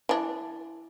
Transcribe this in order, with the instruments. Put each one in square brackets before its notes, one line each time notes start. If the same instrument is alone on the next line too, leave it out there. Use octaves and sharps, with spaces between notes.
[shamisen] E3 D4